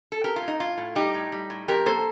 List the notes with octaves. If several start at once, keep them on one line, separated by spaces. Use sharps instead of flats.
A4
C4 G4 A#4
F4
A2
D#4
A2 F4
A2
G3 D#4 G4
A2
G3
A2
F2 G4 A#4
A#3 A4 C5